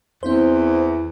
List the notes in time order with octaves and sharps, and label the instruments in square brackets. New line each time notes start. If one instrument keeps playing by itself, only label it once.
[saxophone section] E2 [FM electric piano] C4 E4 C5